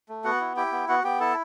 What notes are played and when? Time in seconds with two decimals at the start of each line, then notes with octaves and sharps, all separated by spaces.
0.09 A3
0.24 B3 F#4 F#5
0.40 E4
0.56 E4 G4 G5
0.72 B3
0.88 B3 F#4 F#5
1.04 B3 G4 G5
1.20 E4 A4 A5